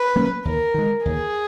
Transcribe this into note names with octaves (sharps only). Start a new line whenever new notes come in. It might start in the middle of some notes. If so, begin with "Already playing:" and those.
Already playing: B4
F#3 A#3 C#4
D#2 A#4
D#3 G#3
D#2 G#4